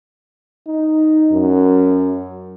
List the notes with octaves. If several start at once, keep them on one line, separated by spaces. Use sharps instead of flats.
D#4
F#2